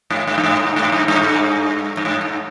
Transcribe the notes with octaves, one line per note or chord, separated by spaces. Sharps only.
G#2
G#2
G2
G#2
G2
G#2
G2
G2
G2
G#2
G2